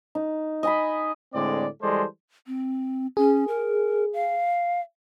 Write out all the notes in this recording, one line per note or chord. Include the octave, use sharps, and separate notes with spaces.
D#4
D#5 G#5 B5
A2 D3 G#3 C4 D5
E3 G3 G#3 A4 C5 D5
C4
C#4 G#4
A#4
F5